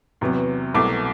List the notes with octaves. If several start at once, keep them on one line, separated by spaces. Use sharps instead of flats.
E2 C3 F#3 B3
C2 B2 F#3 A3 D6